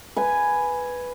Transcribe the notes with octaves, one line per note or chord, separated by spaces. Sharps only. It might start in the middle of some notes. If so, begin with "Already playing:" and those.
B4 G#5